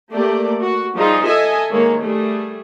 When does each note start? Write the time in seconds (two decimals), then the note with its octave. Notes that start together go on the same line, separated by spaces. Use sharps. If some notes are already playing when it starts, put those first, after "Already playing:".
0.12 A3 A#3 G4 D5
0.59 F#4
0.96 F3 G3 D#4 F4 G#4
1.27 A4 D#5 E5 G#5
1.71 D#3 G#3 A#3 C#5
2.02 G3 A3 G#4